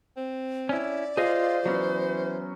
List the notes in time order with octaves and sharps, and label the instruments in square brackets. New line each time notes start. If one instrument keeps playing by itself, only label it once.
[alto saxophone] C4
[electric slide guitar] C#4 E4 [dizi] D5
[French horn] F4 [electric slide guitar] G#4 D#5 F5 [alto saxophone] C5
[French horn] E3 [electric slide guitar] F#3 B3 C#4